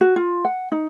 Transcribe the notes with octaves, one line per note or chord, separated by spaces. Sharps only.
F#4
F4
F#5
D#4